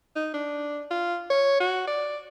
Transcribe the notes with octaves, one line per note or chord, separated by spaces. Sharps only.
D#4
D4
F4
C#5
F#4
D5